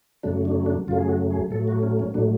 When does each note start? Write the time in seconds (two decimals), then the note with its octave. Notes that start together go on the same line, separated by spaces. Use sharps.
0.23 F#2 C#3 F#3 A3 D4
0.45 D4
0.66 D4
0.88 F#2 C#3 F#3 A3 F4
0.98 G#4
1.09 F#4
1.30 G#4
1.51 A2 F#3 A3 A4
1.68 F#4
1.83 C#4
1.99 C#4
2.14 A2 F#3 A3 D4